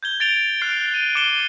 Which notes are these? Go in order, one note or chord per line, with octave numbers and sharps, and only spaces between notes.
G6 G#6 G7
A6 D7 F7 G7
F6 F#6 C7 D7
D#7
D6 C#7 E7 G7